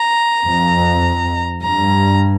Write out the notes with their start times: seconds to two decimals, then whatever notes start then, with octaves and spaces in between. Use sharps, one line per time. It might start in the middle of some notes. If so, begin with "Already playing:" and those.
Already playing: A#5
0.44 F2
1.62 G2 A#5